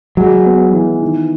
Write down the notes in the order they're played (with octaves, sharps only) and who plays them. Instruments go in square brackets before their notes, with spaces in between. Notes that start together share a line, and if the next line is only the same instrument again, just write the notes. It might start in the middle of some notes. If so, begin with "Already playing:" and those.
[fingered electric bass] F#3 [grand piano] G#3
[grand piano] B3
E3
D#3